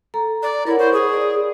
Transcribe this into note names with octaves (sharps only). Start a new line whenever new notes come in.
A4 A#5
D5
E4 A#4 C#5 F#5
C5 B5 C#6
G#4
D5